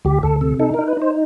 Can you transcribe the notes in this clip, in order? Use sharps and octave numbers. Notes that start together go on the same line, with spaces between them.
D2 G4
D2 A4
C3 A4
D#4 A4
A#4
D#4
B4
D#4 C5